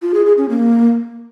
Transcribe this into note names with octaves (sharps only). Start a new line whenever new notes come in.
F4
G#4
G#4
C#4
A#3